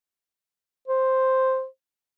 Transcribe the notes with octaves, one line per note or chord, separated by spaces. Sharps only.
C5